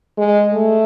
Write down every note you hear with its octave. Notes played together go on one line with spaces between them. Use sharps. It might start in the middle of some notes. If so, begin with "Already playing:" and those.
G#3
A3